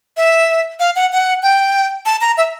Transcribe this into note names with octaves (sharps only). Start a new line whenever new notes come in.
E5
F5
F#5
F#5
G5
A5
A#5
E5